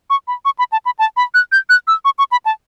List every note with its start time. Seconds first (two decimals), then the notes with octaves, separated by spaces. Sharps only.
0.10 C#6
0.28 B5
0.45 C#6
0.59 B5
0.72 A5
0.85 B5
0.99 A5
1.17 B5
1.34 F#6
1.52 G6
1.70 F#6
1.88 E6
2.05 C#6
2.18 C#6
2.32 B5
2.46 A5